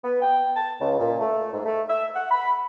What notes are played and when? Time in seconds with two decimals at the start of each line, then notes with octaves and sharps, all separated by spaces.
0.04 B3
0.22 G5
0.56 A5
0.81 C#2
0.99 A#2
1.19 A3
1.54 G#2
1.66 A3
1.88 E5
2.15 F#5
2.31 B5